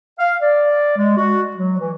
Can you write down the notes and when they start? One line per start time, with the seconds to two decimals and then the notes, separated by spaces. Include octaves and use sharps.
0.19 F5
0.42 D5
0.97 G#3
1.17 F#4
1.57 F#3
1.79 E3